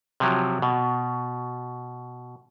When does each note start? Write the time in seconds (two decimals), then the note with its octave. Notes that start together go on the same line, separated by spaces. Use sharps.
0.20 C3 F3 F#3
0.62 B2